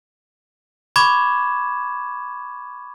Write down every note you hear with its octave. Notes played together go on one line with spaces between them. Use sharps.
B5 C#6 D6 G#6 E7